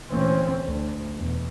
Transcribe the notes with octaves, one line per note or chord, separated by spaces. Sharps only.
D2 A#2 E3 C4 C#4
D2
E2 B2